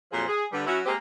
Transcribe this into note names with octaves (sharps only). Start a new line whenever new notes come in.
F2 A#2 F3 F#3 G#4 C5
G#4
D3 G3 B4
F#3 C#4 E4 F#4
G#3 A#3 C4 G4